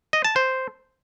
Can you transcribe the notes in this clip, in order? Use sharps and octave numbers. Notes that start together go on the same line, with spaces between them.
D#5
A5
C5